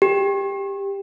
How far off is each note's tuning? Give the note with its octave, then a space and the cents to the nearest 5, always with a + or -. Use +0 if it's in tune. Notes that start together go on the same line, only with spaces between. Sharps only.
G4 +15